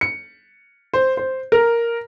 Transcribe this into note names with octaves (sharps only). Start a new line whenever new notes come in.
C#7
C5
C5
A#4